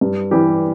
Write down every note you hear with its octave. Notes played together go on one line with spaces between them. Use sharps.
G2
E3 G3 G4